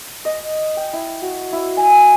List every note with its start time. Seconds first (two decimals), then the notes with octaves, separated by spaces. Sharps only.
0.25 D#5
0.77 G5
0.93 E4
1.22 F#4
1.53 E4
1.77 G#5
1.91 G#5